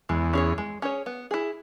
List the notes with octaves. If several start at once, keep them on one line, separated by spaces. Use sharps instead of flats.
E2 G#3
C#4 G#4 C#5
G#3
C#4 G#4 C#5
B3
E4 G#4